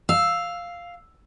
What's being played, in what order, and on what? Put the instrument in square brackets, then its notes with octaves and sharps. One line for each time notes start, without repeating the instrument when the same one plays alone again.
[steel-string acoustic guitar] F5 [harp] E6